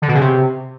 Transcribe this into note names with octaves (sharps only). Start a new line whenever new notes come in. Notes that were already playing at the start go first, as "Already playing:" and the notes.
D3
B2
C#3
C3